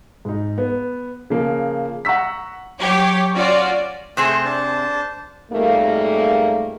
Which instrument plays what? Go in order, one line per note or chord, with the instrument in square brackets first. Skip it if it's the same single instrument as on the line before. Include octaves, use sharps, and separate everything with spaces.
[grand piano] G#2 D#4
B3
C#3 F3 A#3
F#5 A#5 C#6 E6 B6
[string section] F#3 G4 C#5
C#4 F4 F#4 D5
[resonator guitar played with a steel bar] C3 C4 G#4 [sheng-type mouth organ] A3 G5 C#6
[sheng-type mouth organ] D4 C5 A5
[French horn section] F2 G#2 G3 A3 A#3